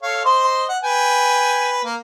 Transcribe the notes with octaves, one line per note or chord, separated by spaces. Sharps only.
A4 C#5 F5
C5 D#5 C6
F#5
B4 G5 G#5
A#3